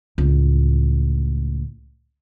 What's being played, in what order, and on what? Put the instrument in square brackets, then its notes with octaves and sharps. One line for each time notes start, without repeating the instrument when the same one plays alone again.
[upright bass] C#2 A2